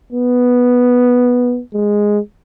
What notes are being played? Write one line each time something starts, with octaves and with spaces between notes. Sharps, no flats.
B3
G#3